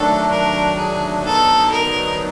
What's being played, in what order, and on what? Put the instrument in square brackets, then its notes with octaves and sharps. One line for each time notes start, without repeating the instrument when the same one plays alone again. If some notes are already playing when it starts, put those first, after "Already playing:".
Already playing: [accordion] D#3 F#3 A3 D4 [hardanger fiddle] A4
[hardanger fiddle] A#4
G#4
[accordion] D3 F#3 B3 D#4 [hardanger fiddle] A4
[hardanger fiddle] A#4